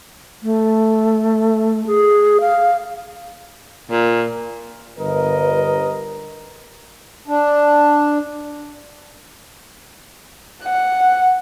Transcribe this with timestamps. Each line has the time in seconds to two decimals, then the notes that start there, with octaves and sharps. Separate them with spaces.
0.43 A3
1.87 G#4
2.40 F5
3.91 A#2
4.98 G1 A#4 B4 D#5
7.28 D4
10.63 F#5